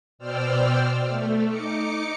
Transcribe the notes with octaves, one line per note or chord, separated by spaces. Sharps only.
B2 C5 D5 G5 E6 F6
A3
D#4 D6 C#7